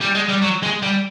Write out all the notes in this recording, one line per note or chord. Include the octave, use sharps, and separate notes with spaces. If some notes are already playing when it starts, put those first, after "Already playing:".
G3
G#3
G3
F#3
G#3
G3